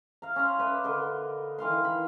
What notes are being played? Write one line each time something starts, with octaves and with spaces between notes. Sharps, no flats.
F5 A#5
C#4 A#5 C6
B4 D5 E5
D3 A#4 D#5
D#3 E3 F5 C6
B5